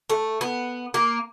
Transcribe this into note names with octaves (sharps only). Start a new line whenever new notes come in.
A3
B3
A#3